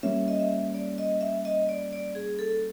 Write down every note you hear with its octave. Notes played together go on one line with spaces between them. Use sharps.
G3 A#3 C#4 E5
D#5
E5
D5
D#5
E5
D#5
D5
D5
G#4
A4